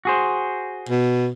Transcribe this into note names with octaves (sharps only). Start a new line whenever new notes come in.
F#4 G#4 C5
B2